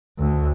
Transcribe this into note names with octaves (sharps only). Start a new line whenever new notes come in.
D2